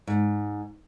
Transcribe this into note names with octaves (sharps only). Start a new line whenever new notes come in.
G#2